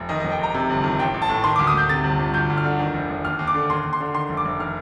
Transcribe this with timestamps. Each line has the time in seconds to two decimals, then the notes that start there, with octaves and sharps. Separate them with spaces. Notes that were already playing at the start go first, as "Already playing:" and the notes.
Already playing: F1
0.09 D#3 D#5
0.20 D#5
0.25 F1
0.31 G5
0.39 F1 A#5
0.54 C3
0.70 G1
0.84 D#3
0.99 A1 G5
1.14 A1
1.22 A5
1.29 A2
1.44 D#3 C6
1.56 D6
1.59 D2
1.67 D#6
1.74 D2 G6
1.89 C3 A6
2.04 G1
2.19 G1
2.34 D2 G6
2.50 D2
2.57 F6
2.64 D3
2.79 D#3
2.94 F1
3.09 F1
3.24 D#2 F6
3.39 D#2
3.47 D6
3.54 D3
3.70 D#2 C6
3.84 D#2
3.93 C6
4.00 D3
4.14 D#3 C6
4.29 F1
4.37 D6
4.45 F1
4.59 D#3 F6